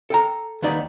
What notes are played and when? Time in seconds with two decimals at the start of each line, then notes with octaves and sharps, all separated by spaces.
0.10 A4 G5 A#5
0.62 D#2 B3 D#4 D5